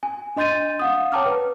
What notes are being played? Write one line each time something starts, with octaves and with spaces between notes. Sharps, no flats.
G#5
D4 D#5 C6 G6 A6 D#7
F5 F#5 D#6
C#5 G5 A5 A#5 D6 F6
B4